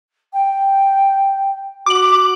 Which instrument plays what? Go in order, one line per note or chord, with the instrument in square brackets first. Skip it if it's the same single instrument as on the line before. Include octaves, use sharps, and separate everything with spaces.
[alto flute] G5
[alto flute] F#4 [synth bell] D6 F#7